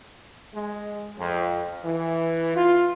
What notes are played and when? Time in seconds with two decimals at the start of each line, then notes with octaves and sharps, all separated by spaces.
0.54 G#3
1.19 F2
1.84 E3
2.55 F4